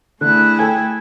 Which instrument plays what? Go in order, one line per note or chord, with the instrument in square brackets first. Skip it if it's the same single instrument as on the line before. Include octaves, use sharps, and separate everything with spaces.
[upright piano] D3 [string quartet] A3 E4 G#4 [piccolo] F#6
[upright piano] A4 G5 G#5 [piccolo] G#6